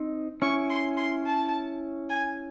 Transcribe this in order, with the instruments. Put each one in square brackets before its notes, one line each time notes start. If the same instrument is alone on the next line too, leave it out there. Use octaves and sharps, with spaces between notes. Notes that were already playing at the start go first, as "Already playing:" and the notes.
Already playing: [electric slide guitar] C4 D#4
[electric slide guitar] C#4 E4 [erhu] C#6
[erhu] C6
C6
A5
G#5